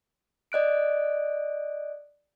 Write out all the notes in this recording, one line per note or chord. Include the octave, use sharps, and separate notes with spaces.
D5 D#5 F#6 D7